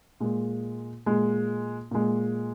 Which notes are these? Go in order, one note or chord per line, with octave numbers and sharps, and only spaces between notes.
A#2 G#3
A#2 G#3
A#2 G#3